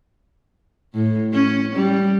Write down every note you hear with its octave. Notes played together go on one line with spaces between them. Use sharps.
A2
C#4
G3